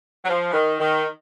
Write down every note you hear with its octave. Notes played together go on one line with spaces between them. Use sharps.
F#3
F3
E3
D#3
D#3